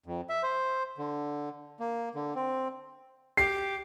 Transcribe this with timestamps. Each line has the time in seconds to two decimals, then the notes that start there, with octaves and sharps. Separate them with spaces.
0.06 F2
0.29 E5
0.43 C5
0.98 D3
1.80 A#3
2.15 D3
2.36 C4
3.37 G4 C7